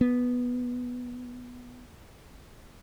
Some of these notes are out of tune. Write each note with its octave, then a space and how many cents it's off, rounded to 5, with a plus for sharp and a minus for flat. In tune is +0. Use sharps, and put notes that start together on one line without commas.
B3 -5